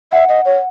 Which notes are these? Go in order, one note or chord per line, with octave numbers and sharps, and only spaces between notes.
E5 F#5
D#5
C#5